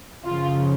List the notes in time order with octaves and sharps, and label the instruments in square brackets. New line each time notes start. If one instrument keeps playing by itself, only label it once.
[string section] F#2 C#3 F3 F4